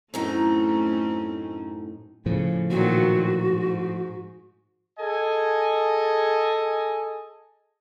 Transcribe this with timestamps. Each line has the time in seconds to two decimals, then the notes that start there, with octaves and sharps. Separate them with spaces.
0.14 F#2 A2 A3 C4 C#4 D#4
2.26 A2 C#3 F3
2.70 A#2 D#3 F#3 F#4
3.47 G#2
4.99 G#4 A4 D#5 G#5